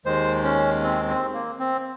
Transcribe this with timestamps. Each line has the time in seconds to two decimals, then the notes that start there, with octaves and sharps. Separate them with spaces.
0.05 D#2 D#3 G#3 C5
0.44 C#4
0.83 C4
1.09 C4
1.33 A#3
1.59 C4